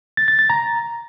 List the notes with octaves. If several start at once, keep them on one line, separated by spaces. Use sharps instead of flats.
A6
A6
A6
A#5